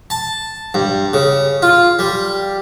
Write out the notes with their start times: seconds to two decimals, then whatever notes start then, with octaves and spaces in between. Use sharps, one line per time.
0.10 A5
0.74 G2
1.13 C#3
1.62 F4
1.99 G3